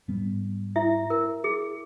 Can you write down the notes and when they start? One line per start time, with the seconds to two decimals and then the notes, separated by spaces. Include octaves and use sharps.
0.08 G#2 G3 B3
0.76 E4 E5
1.10 A#4
1.44 G#4